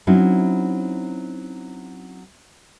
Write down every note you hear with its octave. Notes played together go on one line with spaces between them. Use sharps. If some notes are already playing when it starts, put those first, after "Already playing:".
F#3 C4 C#4 D#4 E4